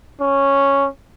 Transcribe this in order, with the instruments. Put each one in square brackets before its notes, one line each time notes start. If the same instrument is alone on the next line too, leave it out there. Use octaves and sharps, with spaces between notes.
[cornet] C#4